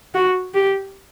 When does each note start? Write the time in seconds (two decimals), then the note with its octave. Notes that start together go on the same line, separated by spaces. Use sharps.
0.15 F#4
0.54 G4